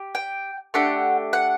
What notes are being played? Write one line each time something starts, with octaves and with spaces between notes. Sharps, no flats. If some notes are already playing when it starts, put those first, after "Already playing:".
Already playing: G4
G5
A3 D4 G4 F#5
F#5